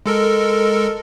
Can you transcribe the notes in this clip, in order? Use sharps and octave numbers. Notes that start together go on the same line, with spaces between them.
G#3 A4 A#4